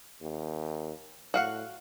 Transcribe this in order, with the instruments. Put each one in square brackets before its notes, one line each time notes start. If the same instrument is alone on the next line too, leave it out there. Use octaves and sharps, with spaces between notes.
[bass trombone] D#2
[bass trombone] A2 [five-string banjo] F#4 F5 F#5